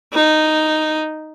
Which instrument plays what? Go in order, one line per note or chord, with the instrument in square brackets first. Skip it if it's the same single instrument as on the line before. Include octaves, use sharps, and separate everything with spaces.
[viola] D#4